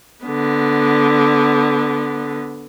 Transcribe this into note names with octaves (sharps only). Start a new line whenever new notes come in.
D3 B3